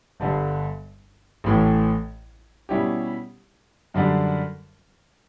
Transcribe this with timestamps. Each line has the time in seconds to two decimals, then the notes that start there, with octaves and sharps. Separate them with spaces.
0.20 G1 G2 D3 G3
1.44 A1 A2 E3
2.69 B2 G3 C#4 E4 G4
3.94 F#2 D3 G3 D4